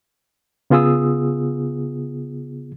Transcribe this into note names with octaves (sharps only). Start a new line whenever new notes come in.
C#3 B3 F4 G#4 D#6 E6